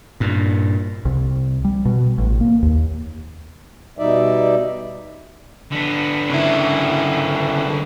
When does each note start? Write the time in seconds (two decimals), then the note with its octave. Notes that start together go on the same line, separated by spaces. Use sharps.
0.20 G2 A#2
1.05 C2
1.64 G3
1.85 B2
2.18 A1
2.41 A#3
2.62 D#2
3.99 B2 G3 D#4 D5 E5
5.72 D3 B3
6.30 C#3 E4